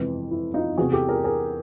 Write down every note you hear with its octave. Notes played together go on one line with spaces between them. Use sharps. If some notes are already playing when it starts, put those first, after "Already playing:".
Already playing: F2 C3 E3 G#3 B3
E4
D#4 F4
E2 C3 E3 F#4 G#4
G4 A4
G#4 A#4
G#4 A#4